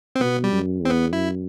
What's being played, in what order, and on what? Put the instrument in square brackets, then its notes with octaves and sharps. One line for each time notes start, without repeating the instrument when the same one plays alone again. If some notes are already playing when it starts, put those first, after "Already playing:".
[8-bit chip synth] C4
[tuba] B2 [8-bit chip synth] B3
[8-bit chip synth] G3
[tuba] F#2
[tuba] E2 [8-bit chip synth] C4
[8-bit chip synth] B3
[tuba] F#2 [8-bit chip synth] E4